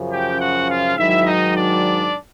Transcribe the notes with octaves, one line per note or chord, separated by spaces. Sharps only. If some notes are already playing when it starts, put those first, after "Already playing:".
Already playing: F#2 C#3 F3
G4 G5
F#4 F#5
F4 F5
G#2 D#3 F#3 E4 E5
D#4 D#5
D4 D5